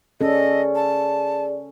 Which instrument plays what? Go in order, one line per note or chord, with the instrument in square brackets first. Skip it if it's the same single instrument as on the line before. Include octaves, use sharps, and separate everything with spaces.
[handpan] C#4 A4 [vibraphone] G#4 D5 [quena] D#5
[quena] A5